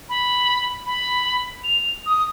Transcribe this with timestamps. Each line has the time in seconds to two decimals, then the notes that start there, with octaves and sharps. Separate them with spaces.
0.09 B5
0.86 B5
1.64 F7
2.06 D#6